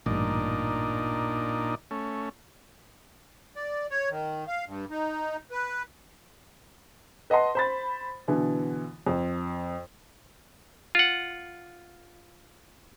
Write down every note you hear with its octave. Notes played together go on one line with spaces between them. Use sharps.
A1 G2 A#2 D4 D#4
A3 C#4
D5
C#5
D#3
F5
G2
D#4
B4
B4 D#5 F#5 A5 C6
C5 B5 A6
B2 D3 E3
F2
F4 F#5